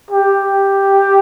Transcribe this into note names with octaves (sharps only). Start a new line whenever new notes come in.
G4